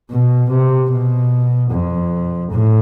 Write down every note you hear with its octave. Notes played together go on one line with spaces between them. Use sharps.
B2
C3
B2
F2
A2